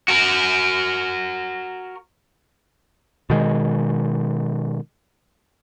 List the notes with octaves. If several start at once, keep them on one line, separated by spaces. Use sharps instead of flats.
F#4 A#4
B2 D#3 G#3